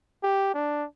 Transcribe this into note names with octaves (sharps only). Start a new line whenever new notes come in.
G4
D4